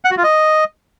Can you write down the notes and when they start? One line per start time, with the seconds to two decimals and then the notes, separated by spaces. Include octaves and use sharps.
0.05 F#5
0.11 F#4
0.17 F4
0.24 D#5